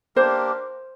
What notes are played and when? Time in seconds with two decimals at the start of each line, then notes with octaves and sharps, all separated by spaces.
0.16 A#3 D4 G4 A#4 C5